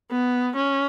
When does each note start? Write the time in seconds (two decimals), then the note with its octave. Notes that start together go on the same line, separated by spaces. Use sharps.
0.11 B3
0.56 C#4